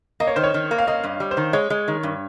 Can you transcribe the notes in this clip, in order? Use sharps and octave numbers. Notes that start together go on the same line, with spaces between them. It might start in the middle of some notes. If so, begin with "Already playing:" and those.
A#3 D#5
C#5
D#3 C5
C#5
D#3
A#3
F5
A#3 D#5
G2
G3
C5
D#3
G#3 C#5
G#3
D#3
G2